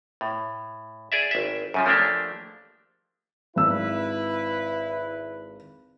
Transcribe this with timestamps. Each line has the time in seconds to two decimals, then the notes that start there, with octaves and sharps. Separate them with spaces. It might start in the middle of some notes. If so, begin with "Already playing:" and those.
0.21 A2
1.12 G#4 D5 E5
1.31 G#1 E5
1.74 F#2 C#3 F3
1.86 F3 A3 A#3 D4 G4
3.56 G#1 E4 B4 E6